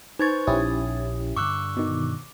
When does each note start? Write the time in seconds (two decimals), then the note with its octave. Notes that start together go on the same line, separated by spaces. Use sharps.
0.19 D#4 B4 C5 C#6 G#6 A6
0.47 A#1 C#4 E4 G4 D#6
1.36 G2 D3 C#6 D6 E6 F#6
1.77 B2 D#3